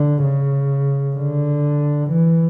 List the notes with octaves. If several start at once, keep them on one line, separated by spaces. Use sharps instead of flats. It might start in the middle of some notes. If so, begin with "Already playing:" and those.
Already playing: D3
C#3
D3
E3